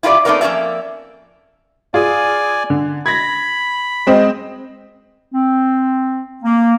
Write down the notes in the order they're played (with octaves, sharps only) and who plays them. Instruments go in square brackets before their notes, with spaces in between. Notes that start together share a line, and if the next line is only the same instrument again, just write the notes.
[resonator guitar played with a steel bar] E4 F4 G4 A#4 D5
A3 B3 C4 D#4 A#4 D5
F2 A#3 C#4 G#4 D5 E5
[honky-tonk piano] F4 G#4 [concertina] D5 G#5
[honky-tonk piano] D3
[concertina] B5 [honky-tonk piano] G#6 A#6
[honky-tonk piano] G#3 C4 D#5
[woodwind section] C4
A#3